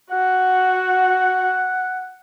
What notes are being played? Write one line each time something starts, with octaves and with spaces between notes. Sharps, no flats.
F#4 F#5